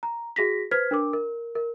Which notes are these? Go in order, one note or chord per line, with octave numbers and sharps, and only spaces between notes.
A#5
F#4 G#4 A#6 B6
B4 C5 F6 G#6 B6
D4 A#4 D6
A#4
A#4